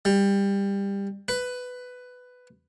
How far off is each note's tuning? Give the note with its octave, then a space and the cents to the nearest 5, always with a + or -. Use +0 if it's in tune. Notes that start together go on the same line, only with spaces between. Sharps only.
G3 +20
B4 +10